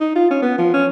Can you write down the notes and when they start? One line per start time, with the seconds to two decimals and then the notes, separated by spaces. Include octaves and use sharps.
0.01 D#4
0.16 F4
0.31 C#4
0.42 B3
0.58 F3
0.74 C#4